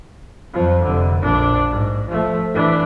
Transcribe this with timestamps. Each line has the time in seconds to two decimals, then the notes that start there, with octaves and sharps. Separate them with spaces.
0.54 F2 F3
0.84 F1 D3
1.22 A#1 D4
1.70 G#2
2.09 F3 A3
2.54 E3 D4